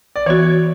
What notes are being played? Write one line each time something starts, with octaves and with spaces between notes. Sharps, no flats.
D5
E3 B3 F#4 C#5